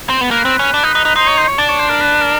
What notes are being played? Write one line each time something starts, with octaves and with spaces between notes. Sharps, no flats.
C4
B3
A#3 B4
C4
C#4
D4
D#4
D#4
D#4
D#4 C5
C#5
C5
C#5
D4 D5
C#5
C5
A#4
B4
A#4